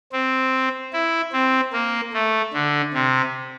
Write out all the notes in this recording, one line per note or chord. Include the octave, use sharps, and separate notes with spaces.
C4
E4
C4
A#3
A3
D3
C3